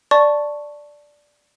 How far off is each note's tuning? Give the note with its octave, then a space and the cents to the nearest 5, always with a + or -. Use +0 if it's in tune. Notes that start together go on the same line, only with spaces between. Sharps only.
D5 +0 A5 +0 C#6 +0